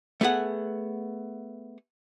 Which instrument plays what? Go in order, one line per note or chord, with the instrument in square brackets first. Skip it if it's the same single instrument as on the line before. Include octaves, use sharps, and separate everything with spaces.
[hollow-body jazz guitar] A3 B3 G#4 F#5